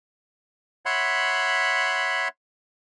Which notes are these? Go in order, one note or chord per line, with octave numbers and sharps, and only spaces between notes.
C#5 E5 F#5 B5 C6